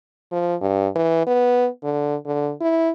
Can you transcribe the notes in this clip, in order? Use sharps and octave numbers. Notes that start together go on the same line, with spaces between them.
F3
G2
E3
B3
D3
D3
E4